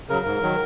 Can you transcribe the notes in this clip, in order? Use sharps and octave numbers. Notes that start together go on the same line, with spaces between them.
C#3 F#3 A#4
G#2
D#3 F#3